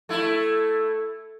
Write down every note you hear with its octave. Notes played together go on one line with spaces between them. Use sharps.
A3 E4